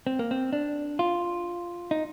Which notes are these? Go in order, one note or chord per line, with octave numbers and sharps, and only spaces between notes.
C4
A#3
C4
D4
F4
D#4